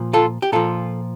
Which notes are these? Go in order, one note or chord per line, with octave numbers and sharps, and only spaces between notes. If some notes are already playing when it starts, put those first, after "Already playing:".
Already playing: A#2 F3
F4 A4
G4
A#2 F3 F4 A4